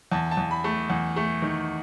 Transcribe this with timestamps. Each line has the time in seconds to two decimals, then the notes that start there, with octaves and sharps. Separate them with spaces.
0.12 E2 A5
0.31 A5
0.37 E2
0.51 B5
0.64 A3
0.90 E2
1.16 A3
1.42 D#3